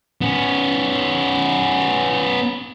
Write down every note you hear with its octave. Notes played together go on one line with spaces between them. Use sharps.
B3 C#4